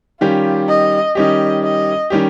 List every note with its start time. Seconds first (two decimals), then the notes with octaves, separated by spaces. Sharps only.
0.20 D#3 G3 C#4 F4 G4
0.69 D#5
1.15 D#3 G3 C#4 G4 D#5
1.63 D#5
2.10 D#3 G3 C#4 G4